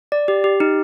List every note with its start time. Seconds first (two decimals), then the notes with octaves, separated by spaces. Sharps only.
0.12 D5
0.28 G4
0.44 G4
0.60 D#4